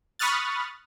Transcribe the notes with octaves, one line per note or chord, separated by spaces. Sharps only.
B5 C#6 D#6 F6 F#6 A6